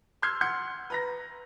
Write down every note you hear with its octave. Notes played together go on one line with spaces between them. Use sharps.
C6 E6 F6 G6 G#6 C7
F#5 C6 G6 C#7
B4 A#5 A#6